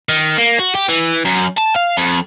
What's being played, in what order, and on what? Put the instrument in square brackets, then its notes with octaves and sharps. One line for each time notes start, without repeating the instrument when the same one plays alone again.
[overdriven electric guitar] D#3
A#3
F#4
G4
E3
F#2
A5
F5
F2